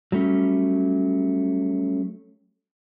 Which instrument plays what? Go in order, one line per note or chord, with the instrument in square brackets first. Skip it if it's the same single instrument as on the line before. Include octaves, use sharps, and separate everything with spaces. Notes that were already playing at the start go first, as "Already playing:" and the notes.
[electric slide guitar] F#3 G3 A3 C#4